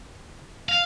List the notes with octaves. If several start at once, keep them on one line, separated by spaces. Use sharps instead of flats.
F5